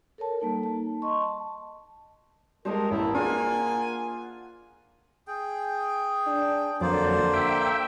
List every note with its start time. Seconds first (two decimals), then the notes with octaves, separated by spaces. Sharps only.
0.18 A4 A#4 C#5 A5
0.40 G3 A#3 D#4 A4
0.63 A5
1.02 D#5 C6 C#6
1.22 A5
2.65 G3 G#3 A#4 C5 A5 D#6
2.91 A1 A#3 E4
3.15 D4 F4 G#4 C5 F#5 G#5
5.27 G#4 G5
6.27 D4
6.81 F2 D3 F#3 A#3 C5 D5
7.34 E5 G5